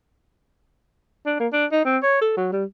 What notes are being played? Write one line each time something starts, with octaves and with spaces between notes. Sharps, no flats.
D4
A#3
D4
D#4
C4
C#5
A4
F#3
G3